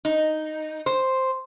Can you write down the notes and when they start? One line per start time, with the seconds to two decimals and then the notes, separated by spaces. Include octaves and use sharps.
0.05 D#4
0.86 C5